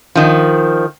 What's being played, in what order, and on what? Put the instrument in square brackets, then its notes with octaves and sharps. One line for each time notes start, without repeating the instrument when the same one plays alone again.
[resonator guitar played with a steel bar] D#3 F3